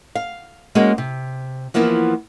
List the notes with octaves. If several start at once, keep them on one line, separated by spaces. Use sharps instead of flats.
F5
G#3 A#3 C#4 F#4 G#4
C3
E3 F3 A#3 B3 E4